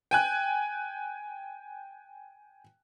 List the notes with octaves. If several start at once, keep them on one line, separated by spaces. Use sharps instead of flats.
G5 G#5 F#6